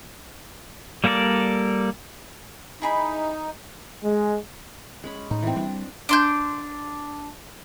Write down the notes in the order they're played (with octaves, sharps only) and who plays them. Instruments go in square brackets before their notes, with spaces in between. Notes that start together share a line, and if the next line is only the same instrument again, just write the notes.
[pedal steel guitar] G3 A#3 A4 A#4 D5
[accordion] D#4 [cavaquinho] E4 G#4 B5
[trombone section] G#3
[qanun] G#3 C#4 B5
[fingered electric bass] A2 [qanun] D#4
[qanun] E3 C4
[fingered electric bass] G3 [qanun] C4 D4
[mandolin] D4 C6 G6